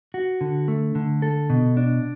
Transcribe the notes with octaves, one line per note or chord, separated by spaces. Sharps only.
F#4
D3
A3
D3
A4
B2
D4